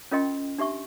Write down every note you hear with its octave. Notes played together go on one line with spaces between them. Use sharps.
C#4 F4 A#4 D#5 G5 C6
D4 G4 E5 C#6